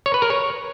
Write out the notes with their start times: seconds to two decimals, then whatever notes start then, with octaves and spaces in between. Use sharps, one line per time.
0.06 C#5
0.14 B4
0.22 A#4
0.30 C#5